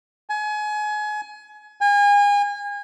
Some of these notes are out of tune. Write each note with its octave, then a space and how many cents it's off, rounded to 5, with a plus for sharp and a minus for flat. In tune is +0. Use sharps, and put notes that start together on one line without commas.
G#5 +30
G#5 -35